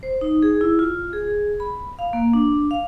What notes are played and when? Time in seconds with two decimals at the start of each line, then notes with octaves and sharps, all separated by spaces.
0.03 C5
0.21 D#4
0.43 G#4
0.61 E4
0.79 F4
1.13 G#4
1.60 B5
1.99 F5
2.13 A#3
2.33 D4
2.71 F5